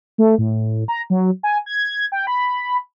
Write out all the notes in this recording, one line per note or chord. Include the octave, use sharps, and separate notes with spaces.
A3
A2
A#5
F#3
G#5
G#6
G5
B5